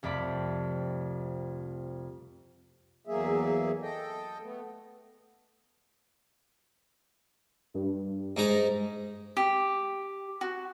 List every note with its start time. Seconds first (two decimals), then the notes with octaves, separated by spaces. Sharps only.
0.03 C2 F2 A3 D5 B5
3.07 E2 F#3 A#3 G#4 E5
3.82 A4 D#5 G5
4.42 A3 B3
7.74 G2
8.37 G#2 D#4 A#5
9.37 G4
10.41 F#4